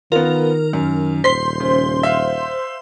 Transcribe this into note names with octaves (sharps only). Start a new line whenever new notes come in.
D#3 B3 F4 A#4
F#2
D#1 C5 C6 B6
C#3
E5 F5